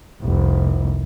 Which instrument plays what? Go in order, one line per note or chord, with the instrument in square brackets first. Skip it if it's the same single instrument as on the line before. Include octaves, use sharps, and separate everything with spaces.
[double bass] F1 C2